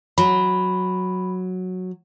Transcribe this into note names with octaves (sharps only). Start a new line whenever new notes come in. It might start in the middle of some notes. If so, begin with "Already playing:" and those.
F#3 B5